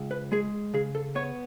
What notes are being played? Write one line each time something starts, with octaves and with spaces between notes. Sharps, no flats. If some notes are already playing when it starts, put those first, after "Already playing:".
Already playing: C#2
B4
G#3 G#4
C#3 G#4
A4
B3 C#5